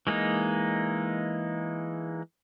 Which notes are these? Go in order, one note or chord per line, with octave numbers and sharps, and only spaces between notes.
E3 G#3 A#3 D#4